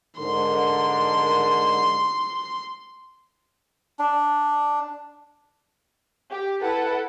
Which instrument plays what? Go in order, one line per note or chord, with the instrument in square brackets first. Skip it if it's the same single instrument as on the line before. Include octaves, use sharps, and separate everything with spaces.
[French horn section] G#2 D3 A#4 [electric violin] C6
[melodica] D4
[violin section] G4
E4 A4 B4 F#5